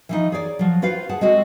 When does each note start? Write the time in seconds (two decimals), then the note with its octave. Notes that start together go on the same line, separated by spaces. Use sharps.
0.09 E3 F3 D#4
0.32 G#4 C#5 D5
0.59 F3 F#3
0.82 F4 F#4 B4 C5 F5
1.09 G#4 F#5 A5
1.21 G#3 C4 F#4 A4